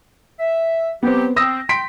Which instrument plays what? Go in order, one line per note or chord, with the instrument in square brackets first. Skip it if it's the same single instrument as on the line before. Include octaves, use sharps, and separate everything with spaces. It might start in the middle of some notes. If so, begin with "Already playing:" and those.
[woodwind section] E5
[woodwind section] F#3 G4 [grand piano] B3 C4
[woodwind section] C4 [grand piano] D#6 E6 A#6
[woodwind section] G5 [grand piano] C6 B6 D7